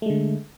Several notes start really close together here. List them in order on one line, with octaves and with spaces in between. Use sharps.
A3 G#3 D3